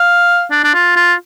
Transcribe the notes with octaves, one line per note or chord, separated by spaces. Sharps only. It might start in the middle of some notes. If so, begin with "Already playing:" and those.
Already playing: F5
D4
D4
F4
F4